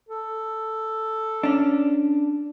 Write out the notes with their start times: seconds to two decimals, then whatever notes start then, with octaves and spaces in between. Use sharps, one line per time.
0.09 A4
1.43 C#4 D4